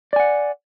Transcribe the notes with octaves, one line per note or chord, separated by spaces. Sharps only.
D5 F#5 G#5